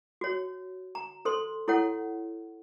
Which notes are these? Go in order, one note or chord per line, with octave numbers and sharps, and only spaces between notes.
F#4 C#5
A#5
A4 C5 C6
E4 A4 C#5 F#5